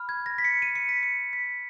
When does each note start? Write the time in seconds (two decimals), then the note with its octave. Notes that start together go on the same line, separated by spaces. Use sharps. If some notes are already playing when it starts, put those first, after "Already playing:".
Already playing: B5 F6
0.09 G#6
0.26 A#6
0.38 B6
0.44 C#7
0.62 D#7
0.75 C#7
0.89 B6
1.03 C#7
1.33 B6